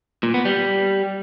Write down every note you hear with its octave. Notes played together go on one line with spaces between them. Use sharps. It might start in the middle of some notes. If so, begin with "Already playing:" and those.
A#2
B3
G3